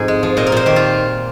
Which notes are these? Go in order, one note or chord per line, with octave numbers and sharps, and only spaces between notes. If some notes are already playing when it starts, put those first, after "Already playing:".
Already playing: F2 G#2 D#4 G#4
G#3
F3
A#2 D#5
A#4
A#2 C5
D#3 G4
F4